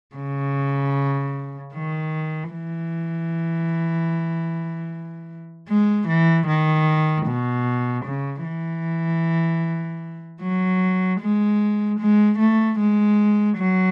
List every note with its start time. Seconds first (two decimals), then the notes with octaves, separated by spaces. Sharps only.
0.16 C#3
1.73 D#3
2.53 E3
5.69 G#3
6.08 E3
6.47 D#3
7.27 B2
8.05 C#3
8.44 E3
10.41 F#3
11.21 G#3
11.99 G#3
12.38 A3
12.79 G#3
13.57 F#3